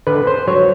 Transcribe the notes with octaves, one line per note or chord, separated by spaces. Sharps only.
D3 B4
C5
F#3 C#5